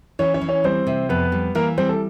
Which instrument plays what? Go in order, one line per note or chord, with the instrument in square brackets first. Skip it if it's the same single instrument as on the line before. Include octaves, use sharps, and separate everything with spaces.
[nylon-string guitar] E3 [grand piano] C#4 C#5
[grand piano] C#4 C#5
[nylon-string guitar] E3
[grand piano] C#4 C#5
[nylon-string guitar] G3 [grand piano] C4 C5
[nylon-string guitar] C3
[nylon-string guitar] F2 [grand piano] B3 B4
[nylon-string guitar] G3
[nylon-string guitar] E3 [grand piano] A#3 A#4
[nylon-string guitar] G3 [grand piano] C4 C5
[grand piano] A4